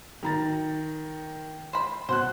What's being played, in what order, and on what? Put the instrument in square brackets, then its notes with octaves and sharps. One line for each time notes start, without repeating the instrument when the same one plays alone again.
[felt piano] D#3 A#5 A6
[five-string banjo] C5 B5
[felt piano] B2 F#5 F#6 [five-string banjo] C5